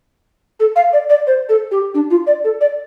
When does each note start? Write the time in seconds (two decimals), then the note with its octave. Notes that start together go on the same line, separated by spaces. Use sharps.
0.60 A4
0.76 F5
0.93 D5
1.10 D5
1.27 C5
1.49 A4
1.71 G4
1.94 D4
2.10 F4
2.27 D5
2.44 A4
2.61 D5